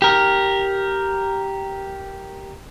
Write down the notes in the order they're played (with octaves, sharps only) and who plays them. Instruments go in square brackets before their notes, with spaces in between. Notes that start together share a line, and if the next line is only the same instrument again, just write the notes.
[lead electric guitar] G4 A#4